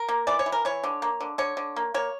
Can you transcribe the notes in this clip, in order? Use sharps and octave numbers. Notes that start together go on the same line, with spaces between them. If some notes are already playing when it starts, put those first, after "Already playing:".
Already playing: A#4
A#3
E3 D5
C#5
E3
A#4
E3 C#5
D3
A#3
D3
D3 C#5
D3
A#3
A#3 C#5